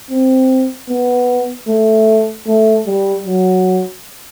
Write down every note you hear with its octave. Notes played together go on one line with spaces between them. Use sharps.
C4
B3
A3
A3
G3
F#3